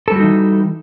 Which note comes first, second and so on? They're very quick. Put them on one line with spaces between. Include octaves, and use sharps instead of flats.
A4 G3 F#4 D#4 E3